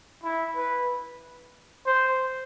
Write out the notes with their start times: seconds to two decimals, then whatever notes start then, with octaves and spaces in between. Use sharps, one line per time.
0.24 E4
0.56 B4
1.86 C5